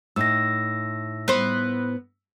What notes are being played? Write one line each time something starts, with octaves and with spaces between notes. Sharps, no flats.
A2 D#4 E6 A#6
B3 C5